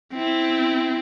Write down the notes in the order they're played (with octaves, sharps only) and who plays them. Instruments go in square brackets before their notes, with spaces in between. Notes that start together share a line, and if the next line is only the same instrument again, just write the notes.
[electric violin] C4 E4